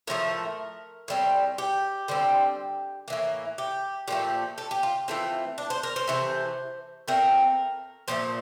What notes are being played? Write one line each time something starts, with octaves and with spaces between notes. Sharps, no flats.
A2 F3 A3 A#4
A2 G3 C4
G4
D3 G3 C4
A2 E3 A#3
G4
A#2 F3 A3 G4
A4
G4
F4
E3 A3 C4 F4
D4
C5
A#4
C5
C3 E3 A3
A#2 A3 C4 A#4
A#2 F3 A3 C5